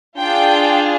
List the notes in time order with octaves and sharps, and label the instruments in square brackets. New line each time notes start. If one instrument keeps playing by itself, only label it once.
[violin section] D4 F4 G#4 G5